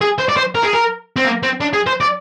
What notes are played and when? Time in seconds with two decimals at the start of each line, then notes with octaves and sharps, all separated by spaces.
0.01 G#4
0.18 C5
0.29 D5
0.37 C5
0.55 A#4
0.63 G#4
0.73 A#4
1.16 C4
1.25 A#3
1.43 C4
1.61 D4
1.73 G#4
1.87 C5
2.01 D5